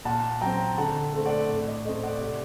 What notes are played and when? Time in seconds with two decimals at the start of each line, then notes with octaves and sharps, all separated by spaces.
0.05 A#2 F#5 A5
0.41 F#3 C4 G5 A#5
0.78 D3 F#5 A5
1.14 A3 C4
1.26 D5 F#5
1.49 A2 D5
1.61 D5
1.67 D#5
1.85 A3 D#5
1.89 C4
2.03 D5 F#5
2.21 C3 D5